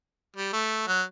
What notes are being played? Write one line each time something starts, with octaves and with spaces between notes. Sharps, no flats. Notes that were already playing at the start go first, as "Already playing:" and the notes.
G3
A3
F#3